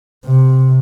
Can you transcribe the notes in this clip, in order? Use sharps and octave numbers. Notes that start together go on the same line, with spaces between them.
C3